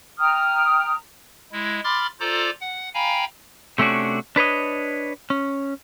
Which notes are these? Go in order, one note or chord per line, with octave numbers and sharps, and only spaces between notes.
G5 A#5 D#6 F6
G#3 E4
B5 C6 D6 F6 A6
F4 A4 C5 D5 A#5 D6
F#5
F5 G5 G#5 A#5 B5
C3 A3 C#4 D4 F#4
D4 B4 C#5 D#5
C#4